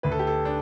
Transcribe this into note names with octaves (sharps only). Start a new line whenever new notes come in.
D2 B4
A4
G4
A4
D4